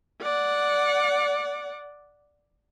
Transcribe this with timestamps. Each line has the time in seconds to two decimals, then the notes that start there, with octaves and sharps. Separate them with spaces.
0.22 D5 F#5